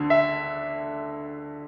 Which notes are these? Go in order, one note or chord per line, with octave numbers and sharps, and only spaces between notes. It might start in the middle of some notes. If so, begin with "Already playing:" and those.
Already playing: D2 D3
E5